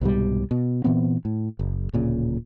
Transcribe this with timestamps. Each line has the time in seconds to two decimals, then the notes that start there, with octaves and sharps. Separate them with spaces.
0.01 C2 G#2 B2 G3
0.51 B2
0.84 A#2 E3 B3 C4
1.25 A2
1.59 F#1
1.93 D1 A#2 C#3